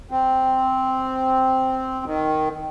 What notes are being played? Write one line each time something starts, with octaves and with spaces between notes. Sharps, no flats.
C4
D#3